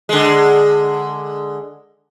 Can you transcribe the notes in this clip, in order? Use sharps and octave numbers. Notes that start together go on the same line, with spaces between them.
D3 G#3